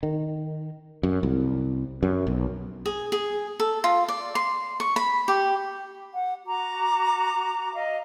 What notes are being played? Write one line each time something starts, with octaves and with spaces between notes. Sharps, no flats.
D#3
F#2
C2
F#2
B1
G#4
G#4
A4
F4
D5
C6
C#6
B5
G4
F#5
F#4 A#5 D6
D#5 F5